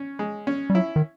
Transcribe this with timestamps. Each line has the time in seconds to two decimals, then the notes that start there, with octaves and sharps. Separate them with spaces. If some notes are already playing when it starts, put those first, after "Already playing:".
Already playing: C#4
0.19 G#3
0.47 C#4
0.70 G3
0.74 F#3 E4
0.96 D#3